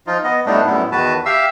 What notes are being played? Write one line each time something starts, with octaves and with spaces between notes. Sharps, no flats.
F3 D#4 F4
B3 D#5
A2 G3 A3 B3 D4 D#4
F#2 A2 G3 B3 E4
E2 D#3 F#4 B4 A5
G4 E5 F5 E6